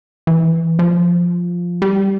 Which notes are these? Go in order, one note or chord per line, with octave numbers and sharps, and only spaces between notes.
E3
F3
G3